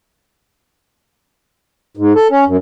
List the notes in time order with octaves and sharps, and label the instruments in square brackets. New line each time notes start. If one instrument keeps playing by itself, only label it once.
[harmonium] G#2
A4
C#4
F#2